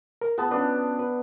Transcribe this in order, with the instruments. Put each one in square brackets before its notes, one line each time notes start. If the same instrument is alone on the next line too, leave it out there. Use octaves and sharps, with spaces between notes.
[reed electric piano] A#4
[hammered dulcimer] B3 [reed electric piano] F4 G#4 A5
[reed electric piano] C#4 F4 B4 [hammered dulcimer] D4
[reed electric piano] B4